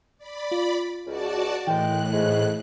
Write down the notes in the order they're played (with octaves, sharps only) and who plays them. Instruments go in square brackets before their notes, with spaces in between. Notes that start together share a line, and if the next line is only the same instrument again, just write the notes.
[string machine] D5 B5
[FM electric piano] F4
[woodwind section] C#2 [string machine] F#4 D5 A5
[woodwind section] D#2 G#3 G5 [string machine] A2 F#6 [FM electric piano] E3 E4
[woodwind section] G#2 C#3 G#3